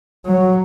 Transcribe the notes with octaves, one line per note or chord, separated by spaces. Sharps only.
F#3